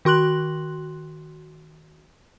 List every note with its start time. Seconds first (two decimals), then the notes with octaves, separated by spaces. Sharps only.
0.05 D#3 F#4 C6 F#6 F#7